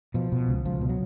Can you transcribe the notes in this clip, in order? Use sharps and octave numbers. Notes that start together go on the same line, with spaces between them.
B2 F3
B2
C#2
C#2 F3
B2
F#3